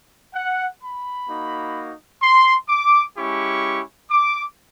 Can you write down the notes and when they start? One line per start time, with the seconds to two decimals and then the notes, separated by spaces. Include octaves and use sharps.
0.33 F#5
0.80 B5
1.27 A#3 D#4 F#4
2.22 C6
2.69 D6
3.16 G#3 C#4 E4 G4 C#6
4.10 D6